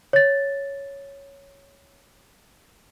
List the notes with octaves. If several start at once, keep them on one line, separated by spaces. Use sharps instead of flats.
C#5 A6